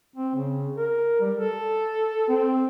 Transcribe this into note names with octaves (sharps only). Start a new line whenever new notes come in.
C4
C#3
A#4
G3
A4
C4